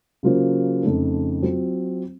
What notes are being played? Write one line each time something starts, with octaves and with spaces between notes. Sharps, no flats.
C#3 F#3 A#3 F4 C5
F2 C#3 A3 D#4 A4
F#3 C4 F4